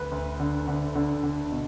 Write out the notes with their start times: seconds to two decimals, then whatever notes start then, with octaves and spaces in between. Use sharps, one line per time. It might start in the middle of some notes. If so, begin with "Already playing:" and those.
Already playing: D2 B4
0.11 D2
0.40 D3
0.68 D3
0.95 D3
1.23 D3
1.51 B2